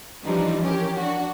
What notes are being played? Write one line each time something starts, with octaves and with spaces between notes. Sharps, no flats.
E3 F3 G3 D4 D#4
C#4 G4 A#4
D4 F#4